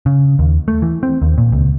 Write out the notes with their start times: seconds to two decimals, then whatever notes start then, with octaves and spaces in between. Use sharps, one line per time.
0.06 C#3
0.39 D#2
0.68 A3
0.82 E3
1.03 C4
1.22 D#2
1.38 A#2
1.52 C#2